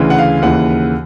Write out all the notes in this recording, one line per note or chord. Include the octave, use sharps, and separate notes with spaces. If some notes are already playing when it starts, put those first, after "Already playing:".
Already playing: D2 C#3 E3
F#5
F5
D#2 C#3 E3 F#5